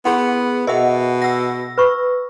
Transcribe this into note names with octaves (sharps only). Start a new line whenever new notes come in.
B3 E4 G#4 F#5 B5 C6
B2 G#4 A#4 D#5 E5 F#5
F#5 E6 A#6
B4 B5 C#6